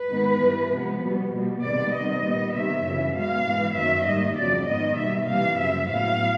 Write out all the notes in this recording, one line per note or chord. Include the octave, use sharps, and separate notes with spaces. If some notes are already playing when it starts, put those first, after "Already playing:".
Already playing: B4
G#2 D#3 G#3 B3
G2 E3 G3
C3 F3 G#3 B3
B2 G3 B3
B2 G3 A#3
C3 D#3 G#3 B3 D5
C3 D#3 G3 D#5
A#2 G3 B3
C3 D#3 G3 E5
F#2 C#3 E3
B2 G#3 B3 F5
G#2 E3 G#3
F#2 D#3 F#3 A#3 E5
G#2 D#3 G3 A#3 D#5
F2 C#3 F#3 D5
G#2 D#3 G#3 B3 D#5
B2 G3 A#3 E5
C3 E3 G3 A#3 F5
F#2 C#3 F3 E5
A2 F#3 B3 F5